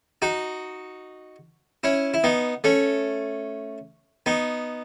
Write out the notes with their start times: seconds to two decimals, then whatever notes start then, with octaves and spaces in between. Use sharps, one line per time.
0.22 D#4 F#4
1.84 C#4 E4
2.14 E4
2.24 B3 D#4
2.64 A3 C#4
4.26 B3 D#4